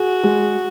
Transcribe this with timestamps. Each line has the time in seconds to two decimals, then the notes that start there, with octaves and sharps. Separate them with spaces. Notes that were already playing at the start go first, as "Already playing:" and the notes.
Already playing: F#4 G#4
0.24 G#3